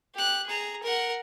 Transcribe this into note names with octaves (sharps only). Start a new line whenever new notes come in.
G4 F#6
G#4 A#5
A#4 F#5